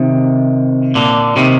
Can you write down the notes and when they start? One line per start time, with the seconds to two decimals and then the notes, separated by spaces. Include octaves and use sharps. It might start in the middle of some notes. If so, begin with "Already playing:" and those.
Already playing: C3 D#3
0.95 A#2 D3
1.36 C3 D#3